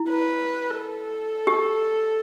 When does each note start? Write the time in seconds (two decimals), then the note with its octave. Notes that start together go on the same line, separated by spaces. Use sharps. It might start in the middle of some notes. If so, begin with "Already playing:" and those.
Already playing: E4
0.09 B4
0.79 A4
1.47 G4